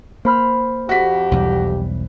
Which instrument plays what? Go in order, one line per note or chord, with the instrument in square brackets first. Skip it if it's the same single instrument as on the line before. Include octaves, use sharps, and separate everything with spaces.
[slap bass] A#3 [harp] C5 B5 F6
[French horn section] F2 G4 [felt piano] F#4 B6
[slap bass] B1 E2 G3